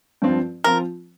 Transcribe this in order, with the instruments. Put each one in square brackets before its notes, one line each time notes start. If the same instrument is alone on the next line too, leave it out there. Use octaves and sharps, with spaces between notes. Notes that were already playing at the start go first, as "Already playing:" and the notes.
[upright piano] G2 F3 C4 F4
[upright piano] F3 C4 F4 [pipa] A#4